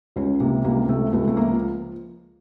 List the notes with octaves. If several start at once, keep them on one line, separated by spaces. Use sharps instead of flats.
C#2 C#4
C3 A#3
C#2 A#3
C3 A3
C#2 A3
A3
F3 A#3